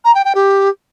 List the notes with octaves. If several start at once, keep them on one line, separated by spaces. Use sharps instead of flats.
A#5
G5
G5
G4